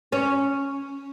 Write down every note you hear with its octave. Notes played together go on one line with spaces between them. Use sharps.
C#4